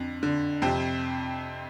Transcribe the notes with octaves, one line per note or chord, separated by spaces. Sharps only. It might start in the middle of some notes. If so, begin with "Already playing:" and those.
Already playing: F2 D3
D3
F2 C3 C4